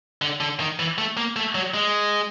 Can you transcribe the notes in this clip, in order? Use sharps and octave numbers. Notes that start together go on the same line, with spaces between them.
D3
D3
D#3
E3
A3
A#3
A3
F#3
G#3